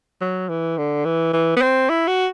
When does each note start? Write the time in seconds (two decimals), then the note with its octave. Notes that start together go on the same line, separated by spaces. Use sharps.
0.21 F#3
0.49 E3
0.78 D3
1.05 E3
1.33 E3
1.57 B3
1.62 C4
1.90 E4
2.07 F#4